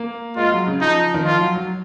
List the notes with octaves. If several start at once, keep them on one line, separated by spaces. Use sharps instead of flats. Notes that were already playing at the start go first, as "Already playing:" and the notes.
Already playing: A#3
G#3 F4
F#3
C#3
F3 D#4
D#3
F3 F4
F#3
F#3